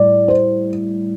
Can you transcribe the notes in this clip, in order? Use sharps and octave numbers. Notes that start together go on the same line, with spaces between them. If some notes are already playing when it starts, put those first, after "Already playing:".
Already playing: A2 G3 D5
C5